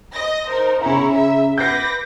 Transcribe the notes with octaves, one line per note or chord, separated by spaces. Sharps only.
D#5 A#6
D#4 A#4 C5
C#3 C#4 E4 C#5 A#5
E5
B4 D6 G6 A#6 C7